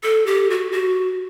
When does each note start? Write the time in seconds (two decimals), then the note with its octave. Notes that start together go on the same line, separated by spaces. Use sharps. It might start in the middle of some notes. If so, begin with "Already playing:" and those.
0.04 A4
0.26 G4
0.50 F#4
0.72 F#4